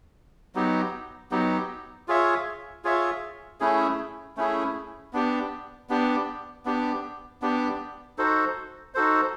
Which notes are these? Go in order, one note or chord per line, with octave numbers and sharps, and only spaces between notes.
F#3 B3 D#4 G4
F#3 B3 D#4 G4
F4 G#4 C#5 E5
F4 G#4 C#5 E5
A3 C#4 E4 G#4
A3 C#4 E4 G#4
B3 D4 G4
B3 D4 G4
B3 D4 G4
B3 D4 G4
D#4 F#4 A4 C5
D#4 F#4 A4 C5